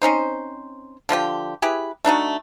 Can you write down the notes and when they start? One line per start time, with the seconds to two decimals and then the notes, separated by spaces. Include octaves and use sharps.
0.02 C4 C#4 D#4 C5
1.09 D3 F3 F4 G4
1.62 E4 G4 G#4 B4
2.05 A3 D4 D#4 F#4